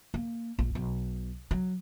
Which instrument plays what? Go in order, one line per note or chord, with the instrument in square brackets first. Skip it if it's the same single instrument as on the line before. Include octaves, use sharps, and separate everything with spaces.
[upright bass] A#3
A#1
B1
F#3